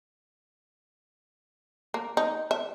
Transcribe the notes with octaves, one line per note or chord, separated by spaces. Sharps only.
A#3
D#4
E5